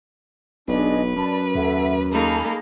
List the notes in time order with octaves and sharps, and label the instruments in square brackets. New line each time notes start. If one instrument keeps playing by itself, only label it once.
[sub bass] E1 [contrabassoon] B1 [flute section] D4 G#4 D#5 [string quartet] B4
[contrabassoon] F#2 [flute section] D5 A5 B5
[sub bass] D#2 [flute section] A4 E5 F#5
[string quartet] A#3 D#4 A4 [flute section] G#4 A5 B5